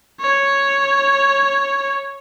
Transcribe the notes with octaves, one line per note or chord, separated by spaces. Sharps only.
C#5